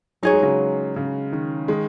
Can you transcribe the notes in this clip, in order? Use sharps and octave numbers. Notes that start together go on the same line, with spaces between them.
F#3 D#4 G#4 C#5
G#3
C#3 F#3
C#3
D#3
D#3 G#3